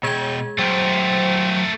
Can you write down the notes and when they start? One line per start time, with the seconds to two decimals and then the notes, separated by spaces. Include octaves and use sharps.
0.03 B2 G#3 G#4 G5 G#6
0.59 F#3 A3 C4 A#4 C5